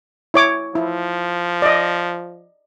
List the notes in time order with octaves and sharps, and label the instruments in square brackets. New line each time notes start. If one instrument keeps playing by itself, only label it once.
[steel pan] E4 C#5 D6
[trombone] F3 [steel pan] E4
[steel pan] D5 D#5